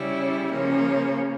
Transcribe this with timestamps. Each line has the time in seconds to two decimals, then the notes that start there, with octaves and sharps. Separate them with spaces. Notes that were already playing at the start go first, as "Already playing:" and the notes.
Already playing: C#3 G3 C#4 E4
0.51 C#3 F3 A#3 C#4